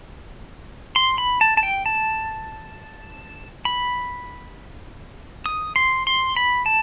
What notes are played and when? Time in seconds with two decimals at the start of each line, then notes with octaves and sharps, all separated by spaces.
0.96 C6
1.18 B5
1.41 A5
1.57 A5
1.63 G5
1.86 A5
3.65 B5
5.46 D#6
5.76 C6
6.07 C6
6.36 B5
6.66 A5